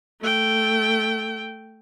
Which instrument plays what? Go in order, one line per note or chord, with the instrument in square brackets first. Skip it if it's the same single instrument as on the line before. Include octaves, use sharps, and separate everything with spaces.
[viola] A3 G5